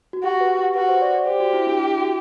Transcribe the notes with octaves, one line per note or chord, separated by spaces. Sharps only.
F#4
F#4 G4
B4
G4
F#4 B4
C5
D5
D5
G4 C5
F#4
E4
D4
E4
F#4